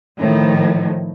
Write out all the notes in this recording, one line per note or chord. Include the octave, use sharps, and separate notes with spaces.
A2 D#3 F3